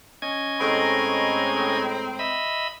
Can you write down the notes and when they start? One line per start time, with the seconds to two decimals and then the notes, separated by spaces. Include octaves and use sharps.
0.22 C#4 D#5 G#6
0.60 A2 G#3 C4 A#5
2.19 D#5 E5 B5